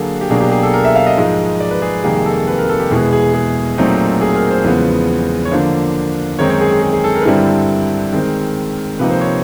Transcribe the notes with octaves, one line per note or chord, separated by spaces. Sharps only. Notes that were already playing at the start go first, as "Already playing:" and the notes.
Already playing: D3 F#3 A#3 G#4 A4
G4
B2 F#3 A#3 D4 G#4
G4
G#4
A4
A#4
E5
F5
D#5
G#2 F3 G#3
D5
B4
G#4
F2 C3 D#3 G3 A#3 G#4
A4
B4
A#4
A4
G4
E2 B2 G#3 B3 E4 G#4
G#4
G#4
A#2 F#3 A3 C4 D#4
G#4
A#4
C5
E2 C#3 F3 G#3 B3
C#5
D3 F3 A#3 D4 C5
F#2 D#3 G#3 C4 D#4 C#5
C#5
G#4
G#4
G#4
G#4
A4
A#4
B4
G2 D3 G3 C4 E4 A#4
D#3 G#3 C4
C3 F3 A#3 D#4 B4
C5
C#5